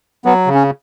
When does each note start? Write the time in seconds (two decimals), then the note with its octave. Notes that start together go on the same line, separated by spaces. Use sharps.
0.25 F#3 B3
0.47 C#3
0.55 C#4